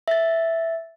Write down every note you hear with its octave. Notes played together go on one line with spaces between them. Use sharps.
E5 A6